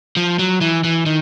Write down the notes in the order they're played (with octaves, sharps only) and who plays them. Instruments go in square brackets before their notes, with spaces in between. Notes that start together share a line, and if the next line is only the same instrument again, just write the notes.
[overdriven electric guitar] F3
F#3
E3
E3
D#3